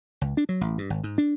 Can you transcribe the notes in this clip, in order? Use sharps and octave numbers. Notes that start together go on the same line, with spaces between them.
C#2
D4
F#3
A1
G2
G#1
G#2
D4